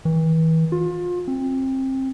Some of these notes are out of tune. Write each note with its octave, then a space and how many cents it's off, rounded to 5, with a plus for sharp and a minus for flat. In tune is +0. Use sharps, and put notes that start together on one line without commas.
E3 -35
F4 +30
C4 +25